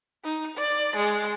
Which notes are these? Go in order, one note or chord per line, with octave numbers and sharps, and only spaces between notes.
D#4
D5
G#3